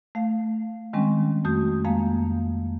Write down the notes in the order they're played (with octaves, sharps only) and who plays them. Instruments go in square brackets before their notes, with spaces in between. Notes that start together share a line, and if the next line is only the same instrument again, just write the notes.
[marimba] A3 F5
D#3 G3 G#3 C4 C#4
F2 A3 F#4 D#6 G6
F2 G#3 A#3 F5 A5 A#5